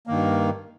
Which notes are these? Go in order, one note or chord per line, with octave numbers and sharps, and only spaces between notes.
G2 D#3 A#3